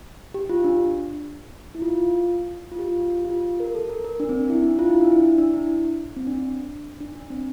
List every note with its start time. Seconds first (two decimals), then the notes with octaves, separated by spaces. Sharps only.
0.34 G4
0.49 F4
0.64 D4
1.75 E4
1.82 F4
1.98 F4
2.72 F4
2.79 G4
2.88 F4
3.25 F4
3.30 G4
3.60 A#4
3.75 A4
3.90 A#4
4.05 A#4
4.20 D4
4.29 C4
4.39 D4
4.50 E4
4.64 D4
4.79 F4
4.90 E4
5.01 D4
5.12 E4
5.38 D4
5.53 E4
6.16 C4
6.27 D4
7.01 D4
7.15 D4
7.30 C4